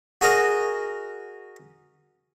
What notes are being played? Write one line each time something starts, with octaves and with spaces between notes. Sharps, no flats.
F#4 G#4 A#4 D#5